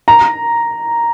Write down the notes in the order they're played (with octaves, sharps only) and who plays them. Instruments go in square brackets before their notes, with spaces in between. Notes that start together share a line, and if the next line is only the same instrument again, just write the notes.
[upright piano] A#5